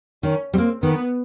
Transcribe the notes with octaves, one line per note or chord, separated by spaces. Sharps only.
D#3 C#4
G3 C4
A#3
D#3 B3